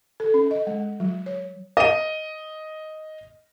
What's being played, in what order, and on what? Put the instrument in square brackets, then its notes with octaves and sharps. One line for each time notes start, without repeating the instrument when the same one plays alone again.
[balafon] A4
C#4
D#5
G#3
F#3
C#5
[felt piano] D#5 D#7